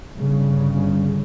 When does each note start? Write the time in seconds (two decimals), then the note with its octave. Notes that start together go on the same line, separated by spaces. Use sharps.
0.15 G1 C#3